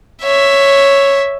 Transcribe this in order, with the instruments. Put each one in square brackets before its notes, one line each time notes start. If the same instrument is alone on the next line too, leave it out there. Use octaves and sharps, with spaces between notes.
[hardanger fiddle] C#5 E5